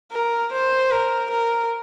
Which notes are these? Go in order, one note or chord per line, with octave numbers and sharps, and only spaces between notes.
A#4
C5
A#4
A#4